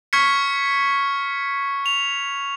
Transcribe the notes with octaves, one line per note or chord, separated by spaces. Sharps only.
C#6 F6 G#6 B6 C#7
F7